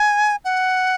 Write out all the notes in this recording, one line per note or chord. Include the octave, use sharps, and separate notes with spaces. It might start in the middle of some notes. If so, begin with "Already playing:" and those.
Already playing: G#5
F#5